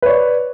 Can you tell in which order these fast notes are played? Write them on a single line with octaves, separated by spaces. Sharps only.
B4 C#5 D5